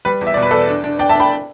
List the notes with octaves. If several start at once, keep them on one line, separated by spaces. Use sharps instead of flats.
G3 B4
E2
E5
B2 D5
B4
E2 A4 D5
D4
D4
D4 D5 G5
E5 A5
D4 G5 B5